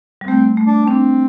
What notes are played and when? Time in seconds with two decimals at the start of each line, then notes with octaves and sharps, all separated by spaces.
0.21 G3
0.27 A3 C4
0.57 A3
0.67 D4
0.87 C4 D4